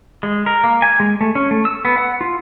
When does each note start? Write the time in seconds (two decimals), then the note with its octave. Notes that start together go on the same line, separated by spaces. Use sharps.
0.23 G#3
0.46 A#4
0.64 A#3
0.82 G#5
1.00 G#3
1.21 A3
1.35 C#4
1.51 A3
1.65 E6
1.85 B3
1.98 F#5
2.21 F4